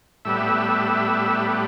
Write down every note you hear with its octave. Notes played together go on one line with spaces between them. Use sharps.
A2 G3 B3 E5